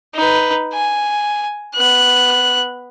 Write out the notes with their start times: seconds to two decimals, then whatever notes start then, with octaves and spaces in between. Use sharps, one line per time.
0.15 D#4 B4
0.73 G#5
1.75 B3 F#6